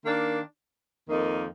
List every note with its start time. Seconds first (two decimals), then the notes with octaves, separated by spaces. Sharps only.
0.03 D#3 A#3 D4
1.08 F2 D#3 A#3 D#4